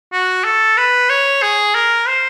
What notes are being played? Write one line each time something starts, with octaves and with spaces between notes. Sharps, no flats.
F#4
A4
B4
C#5
G#4
A#4
C5